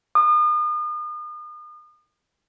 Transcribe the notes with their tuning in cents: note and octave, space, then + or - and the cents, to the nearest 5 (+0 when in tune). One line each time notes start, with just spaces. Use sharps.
D#6 -40